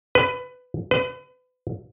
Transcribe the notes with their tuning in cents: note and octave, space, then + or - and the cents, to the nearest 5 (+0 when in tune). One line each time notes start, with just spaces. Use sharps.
B4 +20
B4 +35